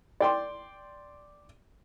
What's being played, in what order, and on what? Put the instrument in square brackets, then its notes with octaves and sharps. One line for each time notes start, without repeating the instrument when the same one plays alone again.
[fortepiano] D5 G5 C6